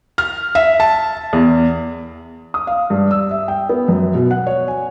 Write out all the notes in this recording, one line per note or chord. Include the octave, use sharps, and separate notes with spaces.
F6
E5
A5
E2
D#6
F5
G2
E6
E5
G5
B3
F#2
B2
F#5
C#5
G#5